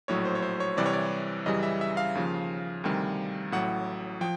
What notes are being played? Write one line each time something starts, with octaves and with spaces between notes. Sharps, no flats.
A#1 A2 F#3 C#5
C5
C#5
C5
C#5
C2 C3 E3 G3 D5
C#5
D5
F#2 C#3 E3 G3 D#5
E5
E5
F5
D#2 C#3 F3
D2 C3 D#3 G3
A1 A2 F#3 F#5
F3 G5